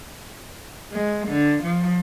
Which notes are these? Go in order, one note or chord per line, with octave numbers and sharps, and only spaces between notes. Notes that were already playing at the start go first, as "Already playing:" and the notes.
G#3
D3
F3